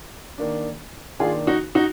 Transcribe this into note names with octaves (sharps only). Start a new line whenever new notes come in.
D#3 A#3 D4
D#3 A#3 D4 F4 G#4
D#4 F#4
D#4 F#4